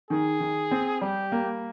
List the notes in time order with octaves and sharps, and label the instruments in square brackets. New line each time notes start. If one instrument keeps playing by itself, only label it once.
[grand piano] D#3 [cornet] G#4
[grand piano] D#3
C4
[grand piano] G3 [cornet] G4
[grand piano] A#3